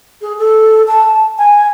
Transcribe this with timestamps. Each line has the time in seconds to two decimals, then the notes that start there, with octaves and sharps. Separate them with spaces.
0.21 G#4
0.38 A4
0.87 A5
1.38 G#5